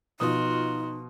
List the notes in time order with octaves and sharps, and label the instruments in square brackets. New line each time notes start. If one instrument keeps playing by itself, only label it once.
[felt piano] B2 F3 D#6 [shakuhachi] D#4 [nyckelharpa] F4 F#4